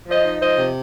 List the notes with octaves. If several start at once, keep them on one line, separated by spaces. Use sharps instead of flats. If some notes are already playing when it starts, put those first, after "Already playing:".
F3 C5 D#5
D#4
F3 C5 D#5
C3